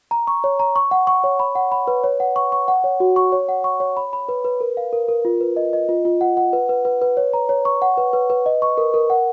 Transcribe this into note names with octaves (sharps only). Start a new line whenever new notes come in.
A#5
C#6
C#5
A#5
C#6
F#5
C#6
C#5
B5
F#5
B5
B4
C#5
F#5
C#6
C#6
F#5
C#5
F#4
C#6
C#5
F#5
C#6
C#5
B5
B5
B4
B4
A#4
F5
A#4
A#4
F4
B4
D#5
D#5
F4
F4
F#5
F#5
B4
B4
B4
B4
C#5
A#5
C#5
C#6
F#5
B4
B4
B4
D#5
C#6
A#4
A#4
F#5